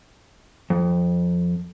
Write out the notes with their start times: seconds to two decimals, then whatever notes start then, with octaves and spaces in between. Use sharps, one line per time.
0.70 F2